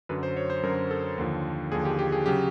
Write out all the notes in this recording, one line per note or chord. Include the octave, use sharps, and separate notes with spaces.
F#2 D3 F#3 B4
C5
C#5
C5
F#2 D3 F#3 A#4
A4
D#2 D3 F3
D#2 D3 F3 G#4
G4
G4
G#4
C#3 F#3 G4